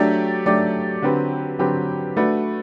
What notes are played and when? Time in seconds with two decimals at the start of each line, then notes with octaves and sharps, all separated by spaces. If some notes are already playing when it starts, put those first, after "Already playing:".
Already playing: F#3 A3 D4 G4 D5
0.45 F#3 A3 D4 G4 D5
1.02 D3 F#3 C4 G4 B4
1.59 D3 F#3 C4 G4 B4
2.17 A3 D4 F#4 B4